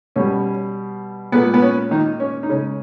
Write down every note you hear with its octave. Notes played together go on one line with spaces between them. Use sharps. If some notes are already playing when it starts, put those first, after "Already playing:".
B2 G3 C#4
A#2 G#3 B3
B3
C#4
D#3 D#4
C#4
D#4
C#3 G#3 C#4